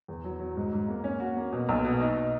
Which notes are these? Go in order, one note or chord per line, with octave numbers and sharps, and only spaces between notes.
E2
F#3
F#3
G#2
G#2
A#3
C#4
F#4
A#3
B2
B1
B2
D#4